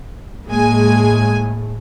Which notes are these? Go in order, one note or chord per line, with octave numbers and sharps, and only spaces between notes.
A2 G#3 A#3 G#5